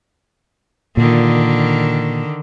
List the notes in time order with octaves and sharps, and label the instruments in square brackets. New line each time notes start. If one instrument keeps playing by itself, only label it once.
[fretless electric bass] A#2 [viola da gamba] D3 D#3